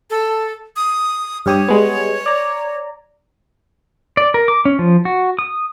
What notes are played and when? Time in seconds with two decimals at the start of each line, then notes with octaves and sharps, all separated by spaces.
0.10 A4
0.76 D#6
1.46 G2 G4 C#5 D#6
1.68 G3 G#3 B3
2.26 D5 A#5
4.17 D5
4.34 A#4
4.48 D6
4.65 C#4
4.79 F3
5.05 F#4
5.39 D#6